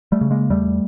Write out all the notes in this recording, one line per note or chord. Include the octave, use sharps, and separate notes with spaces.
G3 A3
C#3
G#3 A#3
E2 G3 A3